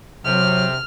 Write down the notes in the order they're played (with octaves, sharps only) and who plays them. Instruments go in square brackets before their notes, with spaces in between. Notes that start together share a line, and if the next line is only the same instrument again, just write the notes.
[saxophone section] C3 [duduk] F#3 [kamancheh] F6